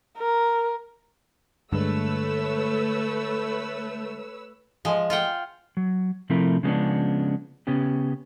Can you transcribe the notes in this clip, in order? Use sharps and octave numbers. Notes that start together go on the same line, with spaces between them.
A#4
G2 D3 G#3 A3 B4 C#5 E6
F3 G#3
F4 F#5 G5
F#3
C3 F3 A3 C4 E4 A#4
C#3 F3 G#3 B3 C#4 D4
C#3 B3 C#4 G4